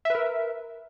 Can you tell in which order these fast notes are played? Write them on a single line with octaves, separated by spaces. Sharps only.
E5 B4 A#4